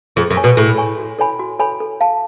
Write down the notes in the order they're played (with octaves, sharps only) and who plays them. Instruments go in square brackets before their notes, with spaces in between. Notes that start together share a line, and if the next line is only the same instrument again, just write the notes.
[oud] F2 [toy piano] G#4
[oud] F#2
[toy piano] C#5 G#5 C#6
[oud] B2
[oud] A2 [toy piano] G#4
[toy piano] C#5 G#5 C#6
F#4
A4 C#5 G#5 B5
F#4
A4 C#5 G#5 B5
A4
F5 A5